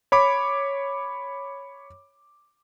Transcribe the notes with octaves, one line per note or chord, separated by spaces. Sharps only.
C#5 B5 D6